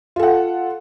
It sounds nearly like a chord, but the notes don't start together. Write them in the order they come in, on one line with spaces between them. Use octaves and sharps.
F4 A4 F#5